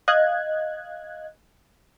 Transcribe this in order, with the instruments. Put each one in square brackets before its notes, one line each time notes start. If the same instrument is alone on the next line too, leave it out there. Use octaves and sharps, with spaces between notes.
[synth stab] D#5 F5 F#6 G#6